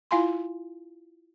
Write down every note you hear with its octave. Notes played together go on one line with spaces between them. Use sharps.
E4 F4 F5 G#5 B5 C6